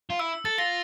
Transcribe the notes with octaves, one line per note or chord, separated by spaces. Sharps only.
F4
E4 E6
A4 A6
F4 A#6